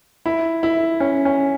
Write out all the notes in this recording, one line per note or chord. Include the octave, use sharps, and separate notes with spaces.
E4
E4
C#4
C#4